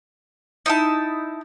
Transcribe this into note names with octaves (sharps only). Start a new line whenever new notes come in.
D#4 E4 A5